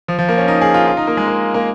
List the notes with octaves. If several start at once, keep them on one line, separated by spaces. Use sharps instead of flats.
F3
F3
A#3
C#4
D#4
G#4
F4
F4
D#4
A#3
G#3
A#3
A#3